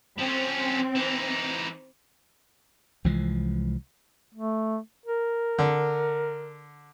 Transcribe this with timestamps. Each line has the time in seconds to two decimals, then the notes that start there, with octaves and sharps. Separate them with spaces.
0.18 F3 C4 C#4
0.95 E3 D#4
3.04 C2 E3 F3 G#3
4.35 A3
5.05 A#4
5.59 D3